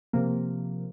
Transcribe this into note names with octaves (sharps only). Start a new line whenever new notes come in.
C3 F3 A#3